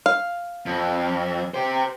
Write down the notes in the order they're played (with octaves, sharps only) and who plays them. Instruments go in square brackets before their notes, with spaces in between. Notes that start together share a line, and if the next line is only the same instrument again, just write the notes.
[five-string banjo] F5
[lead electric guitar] F2
G4 C5